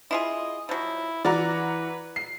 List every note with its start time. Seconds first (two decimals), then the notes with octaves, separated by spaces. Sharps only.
0.11 E4 F4 G#4 D#5
0.69 F3 F#3 E4
1.25 E3 F#4 B4 D5 A#5
2.16 C7